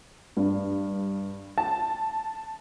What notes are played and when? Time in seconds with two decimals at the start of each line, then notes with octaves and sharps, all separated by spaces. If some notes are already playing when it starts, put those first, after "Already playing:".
0.37 G2
1.58 A5